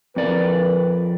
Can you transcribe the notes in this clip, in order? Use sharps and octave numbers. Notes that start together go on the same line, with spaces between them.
F2 C4 A#4 B4 D5